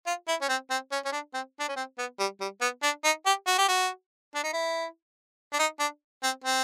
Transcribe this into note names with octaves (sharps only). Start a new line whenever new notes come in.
F4
E4
C#4
C4
C4
C#4
C#4
D4
C4
D4
C#4
C4
B3
G3
G3
B3
D4
D#4
G4
F#4
G4
F#4
D4
D#4
E4
D4
D#4
D4
C4
C4